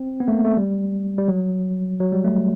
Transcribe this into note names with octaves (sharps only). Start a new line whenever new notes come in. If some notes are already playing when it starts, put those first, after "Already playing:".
Already playing: C4
B3
A3
A#3
A3
G3
G3
F#3
F#3
G3
A3